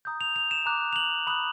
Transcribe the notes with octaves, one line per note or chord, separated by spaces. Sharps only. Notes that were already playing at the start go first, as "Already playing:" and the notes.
A#5 D#6 G6
F7
F7
E7
A#5 D6 F#6
F7
F#7
B5 D#6 F#6 F#7